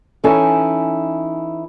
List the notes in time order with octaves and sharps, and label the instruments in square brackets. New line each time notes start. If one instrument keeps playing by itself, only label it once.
[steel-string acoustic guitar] E3 C#4 D#4 E4 A4 G#5